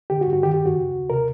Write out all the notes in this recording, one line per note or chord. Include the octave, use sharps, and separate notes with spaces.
D3 G4
F#4
G2
F#4
D#3 G4
G4
F#2
F#4
C#3
D#2
C3 A#4